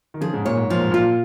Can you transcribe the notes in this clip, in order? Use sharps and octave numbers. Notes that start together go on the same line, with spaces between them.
D#3
C#3 F3 G#4
G#2 C#3
A#2 C#5
G#2
A#2 F3
G#2
A#2 F4